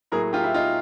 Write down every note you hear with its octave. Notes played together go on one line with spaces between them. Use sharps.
A2 F#3 A#3 G#4 A#4
F4 G4
E4
D#4 F4